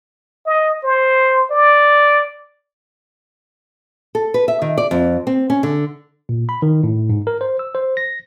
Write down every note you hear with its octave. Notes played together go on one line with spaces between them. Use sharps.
D#5
C5
D5
A4
B4
E5
D#3
D5
F2
C4
C#4
D3
A#2
B5
D#3
A2
G#2
A#4
C5
E6
C5
A#6